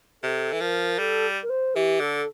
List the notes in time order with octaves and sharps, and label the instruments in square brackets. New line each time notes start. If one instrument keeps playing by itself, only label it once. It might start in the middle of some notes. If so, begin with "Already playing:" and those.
[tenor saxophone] C3 [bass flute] A4
[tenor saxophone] E3
[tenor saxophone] F3 [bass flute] A#4
[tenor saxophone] G3 [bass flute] A4
[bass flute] A#4
C5
[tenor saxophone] E3 [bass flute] G4
[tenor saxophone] D3 [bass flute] A4